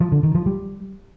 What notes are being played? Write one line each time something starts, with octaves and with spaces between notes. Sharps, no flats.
F3
D3
D#3
F3
G3